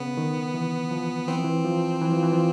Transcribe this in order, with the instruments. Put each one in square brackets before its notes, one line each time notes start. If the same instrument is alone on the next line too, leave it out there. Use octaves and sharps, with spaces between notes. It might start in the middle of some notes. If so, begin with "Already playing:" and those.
Already playing: [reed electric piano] C#3 [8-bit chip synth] B3
[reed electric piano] D#3
E3
F3
[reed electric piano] E3 [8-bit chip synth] C4
[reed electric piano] F3
E3
F3
E3
F3
E3
F3